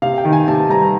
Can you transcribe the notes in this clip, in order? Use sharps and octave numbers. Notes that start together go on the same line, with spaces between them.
C3 F5
G5
D#3
G#5
C3 A5
G3 A#5